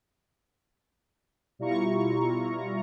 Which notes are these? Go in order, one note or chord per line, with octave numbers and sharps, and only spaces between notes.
B2 G3 E4 F4 A#5 C#6